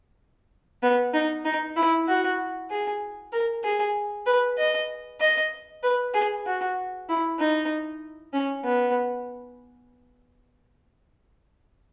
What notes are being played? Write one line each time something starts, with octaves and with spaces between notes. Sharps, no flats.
B3
D#4
D#4
E4
F#4
G#4
A#4
G#4
B4
D#5
D#5
B4
G#4
F#4
E4
D#4
C#4
B3